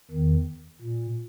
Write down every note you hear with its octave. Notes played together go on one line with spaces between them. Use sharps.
E2 D#3
A#2